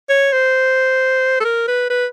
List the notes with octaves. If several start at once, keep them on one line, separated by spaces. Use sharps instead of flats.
C#5
C5
A4
A#4
B4
B4